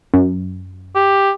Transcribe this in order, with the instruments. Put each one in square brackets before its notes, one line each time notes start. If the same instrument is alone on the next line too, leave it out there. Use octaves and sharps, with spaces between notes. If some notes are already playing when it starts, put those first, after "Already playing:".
[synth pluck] F#2
[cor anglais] G4